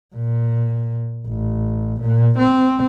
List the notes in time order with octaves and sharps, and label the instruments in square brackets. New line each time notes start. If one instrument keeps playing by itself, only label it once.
[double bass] A#2
A1
A#2
C4